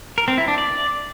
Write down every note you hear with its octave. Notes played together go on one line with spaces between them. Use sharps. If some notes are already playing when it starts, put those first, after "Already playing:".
A#4
C4
E4
D4
D5